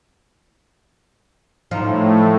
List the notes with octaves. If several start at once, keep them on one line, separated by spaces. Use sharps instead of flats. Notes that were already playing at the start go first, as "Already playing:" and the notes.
A2 F3 D#4